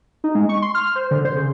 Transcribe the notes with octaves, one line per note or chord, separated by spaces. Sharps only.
D#4
G#3
C#6
C6
F6
C5
D3
C5
C#3